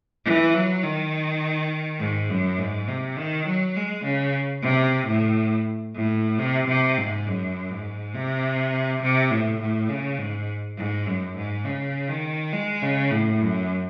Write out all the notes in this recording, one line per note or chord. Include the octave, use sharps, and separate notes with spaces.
E3
F#3
D#3
G#2
F#2
G#2
C3
D#3
F#3
G#3
C#3
C3
A2
A2
C3
C3
G#2
F#2
G#2
C3
C3
A2
A2
C#3
G#2
G#2
F#2
G#2
C#3
D#3
G#3
C#3
A2
F#2